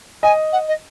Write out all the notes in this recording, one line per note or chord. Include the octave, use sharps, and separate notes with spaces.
D#5 G#5
F#5
D#5